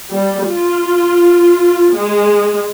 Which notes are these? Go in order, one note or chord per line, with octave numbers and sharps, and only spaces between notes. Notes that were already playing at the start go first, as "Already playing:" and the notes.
G3
F4
G#3